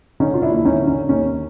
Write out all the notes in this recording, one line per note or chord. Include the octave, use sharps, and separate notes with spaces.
D3 C#4 D#4
F4
D4 E4
D#2
E4
C#4 D#4
D3
C#4 D#4
D#2 C#4 D#4